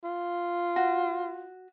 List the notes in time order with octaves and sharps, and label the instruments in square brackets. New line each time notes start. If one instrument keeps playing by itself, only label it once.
[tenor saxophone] F4
[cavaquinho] F#4